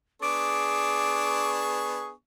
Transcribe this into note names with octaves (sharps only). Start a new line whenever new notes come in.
B3 D4 G#4 C#6 D6